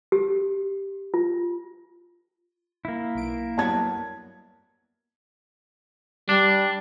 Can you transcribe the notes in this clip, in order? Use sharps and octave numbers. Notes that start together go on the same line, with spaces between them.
G4
F4
A#3 E4
B1 D7
F#3 G3 B3 A5 G#6
G3 D4